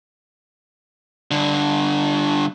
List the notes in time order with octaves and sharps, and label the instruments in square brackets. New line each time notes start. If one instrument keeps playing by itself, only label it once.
[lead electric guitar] G2 D3